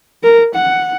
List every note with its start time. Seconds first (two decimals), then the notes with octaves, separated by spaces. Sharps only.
0.23 A#4
0.55 F#5